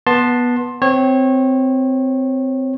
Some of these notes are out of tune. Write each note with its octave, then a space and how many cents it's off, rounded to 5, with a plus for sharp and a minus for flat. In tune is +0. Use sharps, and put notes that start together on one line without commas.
B3 -15 A5 +0 C6 +15
C4 -15 C#5 -25